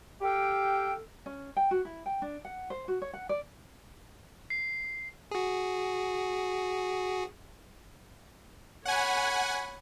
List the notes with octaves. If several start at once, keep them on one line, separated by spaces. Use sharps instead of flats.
G4 A4 F5 G5
C#4
G5
F#4
E4
G5
D4
F#5
C5
F#4
C#5
F#5
D5
C7
F#4 G#4
C#5 F#5 G#5 B5